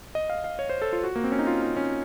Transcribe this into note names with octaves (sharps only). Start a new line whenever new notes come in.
D#5
F5
F5
C#5
C5
A4
F4
F#4
A#3
C4
C#4
D#4
F4
D#4
C#4